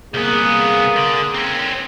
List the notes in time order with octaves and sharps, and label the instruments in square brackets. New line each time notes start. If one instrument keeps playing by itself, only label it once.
[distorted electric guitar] C2 B3 [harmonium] A#3 G#4
[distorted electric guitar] D3
C4 C#4